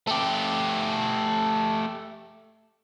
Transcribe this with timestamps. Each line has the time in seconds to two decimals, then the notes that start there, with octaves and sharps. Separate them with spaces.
0.07 A3 G4